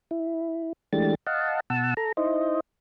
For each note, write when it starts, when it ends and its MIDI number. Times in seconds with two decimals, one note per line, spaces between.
0.11 0.73 64
0.93 1.15 52
0.93 1.15 56
0.93 1.15 57
0.93 1.15 62
0.93 1.15 67
0.93 1.15 93
1.27 1.60 75
1.27 1.60 77
1.27 1.60 78
1.27 1.60 81
1.70 1.94 47
1.70 1.94 78
1.70 1.94 81
1.70 1.94 88
1.97 2.12 69
1.97 2.12 82
2.17 2.60 63
2.17 2.60 64
2.17 2.60 72
2.17 2.60 75